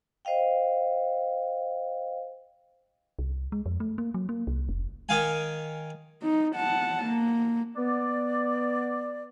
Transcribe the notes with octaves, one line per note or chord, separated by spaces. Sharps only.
C5 D#5 F5 G5
C2
G#3
F2
A3
A#3
F#3
A#3
C2
F1
D#3 F5 G#5
D#4
F#5 A5
A#3
B3 D5